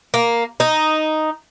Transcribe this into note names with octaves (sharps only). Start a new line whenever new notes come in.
A#3
D#4